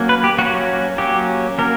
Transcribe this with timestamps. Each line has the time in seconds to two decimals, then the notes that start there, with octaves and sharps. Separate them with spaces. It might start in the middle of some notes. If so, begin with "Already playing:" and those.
Already playing: F#3 A#3 C#4
0.09 B4
0.24 G4
0.38 F#3 A#3 C#4 F#4
0.98 F#3 A#3 C#4 G4
1.58 F#3 A#3 C#4 A#4